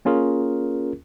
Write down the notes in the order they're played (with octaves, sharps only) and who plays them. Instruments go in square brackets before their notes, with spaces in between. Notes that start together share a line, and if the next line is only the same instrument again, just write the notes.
[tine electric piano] A#3 C#4 F4 G#4 A#4